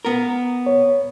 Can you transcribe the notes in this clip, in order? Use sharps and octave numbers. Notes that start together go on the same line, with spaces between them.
B3 A#4
C#5